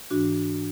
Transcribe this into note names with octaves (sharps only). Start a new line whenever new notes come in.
G#2 E3 D4 F#4